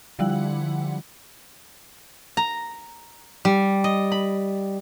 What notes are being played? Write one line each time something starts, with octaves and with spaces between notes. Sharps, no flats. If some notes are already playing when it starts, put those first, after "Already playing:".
D3 F3 G3 E4 F#5
A#5
G3
D#5
B5